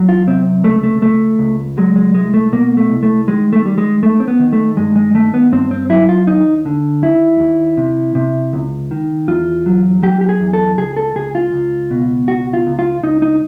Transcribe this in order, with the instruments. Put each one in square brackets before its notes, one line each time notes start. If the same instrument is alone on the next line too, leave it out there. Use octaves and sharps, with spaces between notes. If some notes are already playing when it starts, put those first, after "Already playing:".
Already playing: [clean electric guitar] E2 F#3
F4
C3 C4
C#2 A3
A3
C#2 A3
C#2
F#3 G#3
G#3
C2 G#3
A3
B2 A#3
A3
C2
A3
D#3 G#3
A3
G3
G#3
D#2 A3
C4
B3
D#3
A3
G2 G#3
G#3
D#3 A3
B3
G2 C4
C4
F#3 E4
F4
D#2 D#4
D3
D#2 E4
D#2
C3
C3
C#2
D#3
E2 F4
F#3
F#3 G4
G4
G#4
E2
A4
C#2 G#4
A4
C#2 G#4
F4
C#2
B2
C#2 F#4
F4
C#2
F4
C#2 D#4
D#4